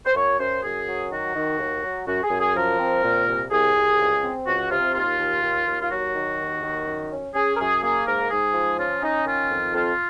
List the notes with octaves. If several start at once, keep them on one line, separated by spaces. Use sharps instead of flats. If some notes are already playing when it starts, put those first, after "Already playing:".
C5
F#2 C#5
F#2 C5
F#2 G#4
F#3
D#3 F#4
D#3
D#2
F#3
F#2 F#4
G#4
F#2
G#4
F3 A#4
C4
A#2
C2
C2 G#4
C2
C#2
C4
C#2 F#4
C3 F4
D#2 F4
D#2
D#2
D#2
F4
F#3 F#4
D#3
D#2
D#3
F#2
C#4
C#4 G#4
A#4
F#2 G#4
A#3 G#4
G#2 A#4
G#2 G#4
F3
C#4 F4
C#4 D#4
D#3 F4
F2
F2 F4